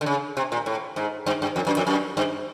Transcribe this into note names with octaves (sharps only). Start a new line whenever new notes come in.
D3
C#3
C3
A#2
A2
G#2
G2
G2
F2
F#2
F2
F#2
G2